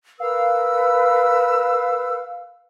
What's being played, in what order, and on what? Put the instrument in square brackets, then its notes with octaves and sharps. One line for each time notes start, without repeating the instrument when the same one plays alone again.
[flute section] A#4 B4 E6 [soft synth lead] F5